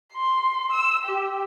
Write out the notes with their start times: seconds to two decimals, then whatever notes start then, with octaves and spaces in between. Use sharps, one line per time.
0.13 C6
0.72 E6
1.05 G4